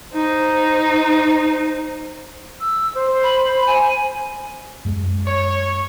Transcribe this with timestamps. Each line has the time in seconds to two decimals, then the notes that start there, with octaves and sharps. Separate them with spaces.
0.14 D#4 C5
2.61 E6
2.95 C5
3.23 B5
3.66 G#5
4.85 F#2 G#3
5.26 C#5